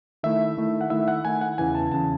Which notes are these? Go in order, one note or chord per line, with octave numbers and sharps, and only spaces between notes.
D#3 A3 E4 E5
D#3 A3 E4
F#5
D#3 A3 E4 E5
F#5
D#3 A3 E4 G#5
F#5
E2 C#3 E3 G#5
A5
E2 C#3 E3 A5